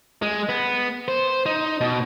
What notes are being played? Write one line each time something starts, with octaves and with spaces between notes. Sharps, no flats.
G#3
B3
C5
D#4
B2